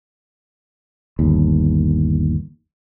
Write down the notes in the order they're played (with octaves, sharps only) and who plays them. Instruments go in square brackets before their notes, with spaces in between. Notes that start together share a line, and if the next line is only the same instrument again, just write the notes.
[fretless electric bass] G1 D#2